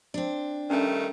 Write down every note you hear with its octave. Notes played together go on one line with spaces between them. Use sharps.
C4 D4
G2 D#3 A3 C#4